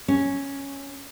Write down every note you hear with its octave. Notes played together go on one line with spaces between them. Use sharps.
C#4